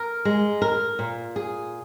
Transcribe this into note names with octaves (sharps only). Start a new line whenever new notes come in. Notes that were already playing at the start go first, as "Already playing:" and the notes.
Already playing: A#4
G#3
A#4
A#2
G#4